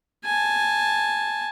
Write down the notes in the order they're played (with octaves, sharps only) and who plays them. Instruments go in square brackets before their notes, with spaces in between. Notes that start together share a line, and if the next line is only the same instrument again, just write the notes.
[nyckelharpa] G#5 A5